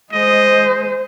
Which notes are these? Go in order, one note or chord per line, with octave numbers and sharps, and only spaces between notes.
G#3 C5 D#5